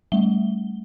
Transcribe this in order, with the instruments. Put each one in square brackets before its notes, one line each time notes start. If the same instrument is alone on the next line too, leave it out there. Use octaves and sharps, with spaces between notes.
[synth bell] G3 A3 G7